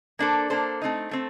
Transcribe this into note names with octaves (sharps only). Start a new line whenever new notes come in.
A#3 D4 A4 C5
A#3 D4 A4 C5
A3 C4 D#4
A3 C4